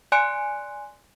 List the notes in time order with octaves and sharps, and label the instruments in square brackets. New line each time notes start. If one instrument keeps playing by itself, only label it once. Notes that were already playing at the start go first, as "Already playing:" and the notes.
[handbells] D5 G#5 C6 F#6 C#7 D7